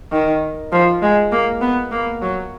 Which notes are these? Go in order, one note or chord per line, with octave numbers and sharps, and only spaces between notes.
D#3
F3
G#3
A#3
B3
A#3
F#3